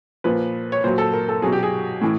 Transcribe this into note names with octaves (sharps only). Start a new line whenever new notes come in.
A#2 F3 B4
C#5
A#2 F#3 C5
A4
A#4
A4
B2 F#3 G#4
G4
G#4
A2 E3